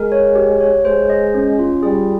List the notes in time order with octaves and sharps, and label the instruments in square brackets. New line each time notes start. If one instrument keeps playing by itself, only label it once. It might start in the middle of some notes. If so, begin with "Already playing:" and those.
Already playing: [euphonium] G#3 [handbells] A#4
[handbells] C#5
G4
C#5
[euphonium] G#3 [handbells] C5
[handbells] D#5
C#4
F4
[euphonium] G3 [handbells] G#4